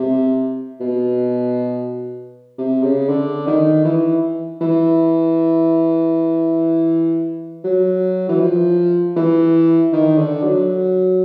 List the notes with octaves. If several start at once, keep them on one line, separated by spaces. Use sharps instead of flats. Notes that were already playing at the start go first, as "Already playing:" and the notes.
Already playing: C3
B2
C3
C#3
D3
D#3
E3
E3
F#3
E3
F3
E3
D#3
D3
F#3